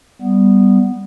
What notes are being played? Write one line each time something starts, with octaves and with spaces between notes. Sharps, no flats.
G3 B3